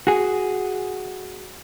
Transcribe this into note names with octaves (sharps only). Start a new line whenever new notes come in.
F#4 G#4